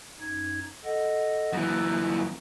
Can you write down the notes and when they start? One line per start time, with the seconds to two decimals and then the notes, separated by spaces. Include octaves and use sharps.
0.20 F#2 D#4 G#6
0.84 A4 D#5 F#5
1.53 F#2 E3 A#3